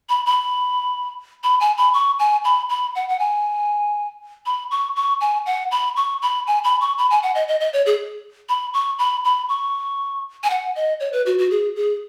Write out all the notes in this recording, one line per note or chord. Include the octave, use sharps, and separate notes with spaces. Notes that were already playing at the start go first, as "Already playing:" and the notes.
B5
B5
B5
G#5
B5
C#6
G#5
B5
B5
F#5
F#5
G#5
B5
C#6
C#6
G#5
F#5
B5
C#6
B5
G#5
B5
C#6
B5
G#5
F#5
D#5
D#5
D#5
C#5
G#4
B5
C#6
B5
B5
C#6
G#5
F#5
D#5
C#5
B4
F#4
F#4
G#4
G#4